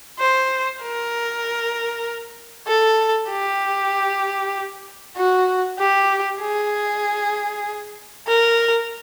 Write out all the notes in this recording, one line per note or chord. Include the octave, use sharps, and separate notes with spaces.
C5
A#4
A4
G4
F#4
G4
G#4
A#4